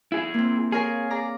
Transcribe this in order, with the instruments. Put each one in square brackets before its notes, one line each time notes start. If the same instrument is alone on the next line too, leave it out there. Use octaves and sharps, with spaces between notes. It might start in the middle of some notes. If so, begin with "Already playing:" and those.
[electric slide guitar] E4 G#4
[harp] A#3 C4
[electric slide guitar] G#4 [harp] A#4 C#5 F5
[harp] D5 A#5 D6